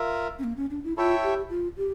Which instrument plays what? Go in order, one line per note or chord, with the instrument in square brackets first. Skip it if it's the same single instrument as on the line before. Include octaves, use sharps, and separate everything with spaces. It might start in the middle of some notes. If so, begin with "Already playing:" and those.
Already playing: [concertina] F4 A#4 E5
[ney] C#4
A#3
C#4
D4
E4
[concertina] E4 A4 C#5 E5 G5 [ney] F4
[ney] G4
F4
G4